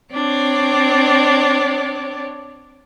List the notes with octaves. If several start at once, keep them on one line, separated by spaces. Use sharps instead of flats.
C4 D4 C#5 D5